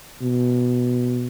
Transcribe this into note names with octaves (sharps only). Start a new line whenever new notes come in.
B2